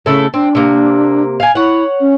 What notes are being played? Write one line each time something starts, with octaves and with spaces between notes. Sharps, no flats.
C#3 A3 E4 A4
C4 D4
C3 A#3
F5 G#5
E4 C#5 F#5
C#4